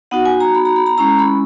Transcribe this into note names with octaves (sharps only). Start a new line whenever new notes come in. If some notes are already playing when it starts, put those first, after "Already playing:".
B3 D#4 F#4 F#5
G#5
A#5
B5
A#5
B5
A#5
G#3 C#4 E4 A#5
B5